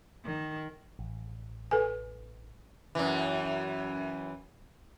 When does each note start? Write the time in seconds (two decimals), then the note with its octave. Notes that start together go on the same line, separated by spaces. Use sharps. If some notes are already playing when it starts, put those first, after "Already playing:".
0.24 D#3
0.99 A1
1.71 A4 B4 G#5
2.95 F#2 E3